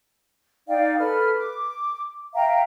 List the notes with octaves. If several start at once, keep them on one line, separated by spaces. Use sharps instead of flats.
D#4 D5 F5 G5
A4 B4 F6
D6
E5 F5 G5 A#5